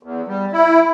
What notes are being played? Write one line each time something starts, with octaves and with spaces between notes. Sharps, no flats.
E2
G3
E4